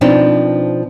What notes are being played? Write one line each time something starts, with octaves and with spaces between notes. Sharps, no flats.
B2 F3 C4 D4 D#4